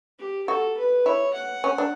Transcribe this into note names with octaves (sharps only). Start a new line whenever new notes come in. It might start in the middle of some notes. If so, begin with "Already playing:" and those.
G4
F#4 A4
B4
E4 C#5
F#5
C#4
D4